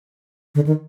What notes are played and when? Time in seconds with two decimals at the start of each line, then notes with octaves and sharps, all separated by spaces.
0.55 D3
0.67 D#3